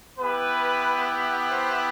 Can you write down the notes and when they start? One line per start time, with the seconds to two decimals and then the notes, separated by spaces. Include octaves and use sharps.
0.19 B3 E4 G4 B4
1.49 C5